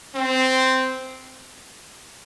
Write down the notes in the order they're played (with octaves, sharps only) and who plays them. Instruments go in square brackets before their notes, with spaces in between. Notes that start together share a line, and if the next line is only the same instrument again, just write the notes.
[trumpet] C4